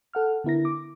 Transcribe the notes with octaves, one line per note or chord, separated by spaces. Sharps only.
A4 F#5 F6
D3 B3 E4 A#4 A#6
D6